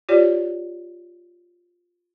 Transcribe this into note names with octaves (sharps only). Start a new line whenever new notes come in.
F4 G4 C#5 D5